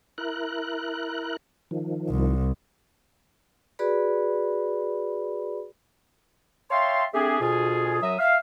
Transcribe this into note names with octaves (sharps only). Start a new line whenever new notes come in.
E4 A#4 F#6
D#3 F3
C2
F#4 G#4 B4 D5 B5
C#5 E5 F5 G5 A5 C6
A3 C4 D4 G4 G#4
D2 B2 F4 G#4
F#2 F#3 E5 D#6
E5 F5